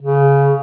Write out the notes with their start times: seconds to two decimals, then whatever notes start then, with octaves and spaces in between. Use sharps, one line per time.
0.02 C#3